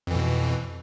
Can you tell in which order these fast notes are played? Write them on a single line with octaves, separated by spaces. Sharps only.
F2 E3 B2